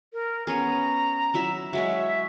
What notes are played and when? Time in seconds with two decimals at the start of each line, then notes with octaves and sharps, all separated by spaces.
0.13 A#4
0.47 B3 C#4 G#4 A#5
1.34 F#3 E4 E5
1.73 F#3 G#3 C#5 E5